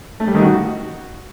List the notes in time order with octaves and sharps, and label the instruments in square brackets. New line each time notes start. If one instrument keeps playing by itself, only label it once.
[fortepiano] A3
G3
D#3
F#4